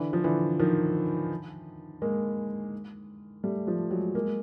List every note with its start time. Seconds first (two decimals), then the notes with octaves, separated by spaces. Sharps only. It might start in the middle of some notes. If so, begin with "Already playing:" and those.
Already playing: D3 E3
0.13 F3
0.24 D3 E3
0.59 D#3 F3
2.02 G#3 A#3
3.44 G3 A3
3.67 F3 G3
3.91 F#3 G#3
4.15 G#3 A#3